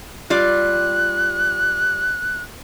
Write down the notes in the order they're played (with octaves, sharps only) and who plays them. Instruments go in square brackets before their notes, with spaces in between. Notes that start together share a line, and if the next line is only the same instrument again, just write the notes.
[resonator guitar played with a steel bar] G3 F4 D5 [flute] F#6